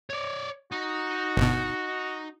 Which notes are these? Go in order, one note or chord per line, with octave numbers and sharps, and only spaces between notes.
C#5 D5
D#4 F#4
G1 B2